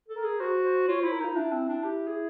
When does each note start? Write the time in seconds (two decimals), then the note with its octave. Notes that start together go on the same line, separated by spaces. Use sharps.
0.08 A4
0.16 A#4
0.24 G#4
0.40 F#4 C5
0.64 C5
0.88 F4 C#5
1.00 E4 C5
1.12 A#4
1.20 D#4 F4
1.36 D4 E4
1.52 C4
1.68 D4
1.84 G4
2.07 G#4